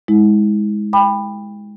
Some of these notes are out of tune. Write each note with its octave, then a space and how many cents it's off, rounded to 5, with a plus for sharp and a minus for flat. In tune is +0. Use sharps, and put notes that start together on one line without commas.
G#3 +0 E4 -35
G5 +25 B5 +0 D6 +45